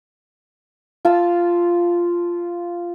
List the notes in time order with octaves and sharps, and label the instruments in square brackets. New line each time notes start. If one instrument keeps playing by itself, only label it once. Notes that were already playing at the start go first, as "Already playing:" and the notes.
[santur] F4 F5 A5 E6